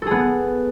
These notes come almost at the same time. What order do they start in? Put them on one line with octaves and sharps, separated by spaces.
A4 G#4 B3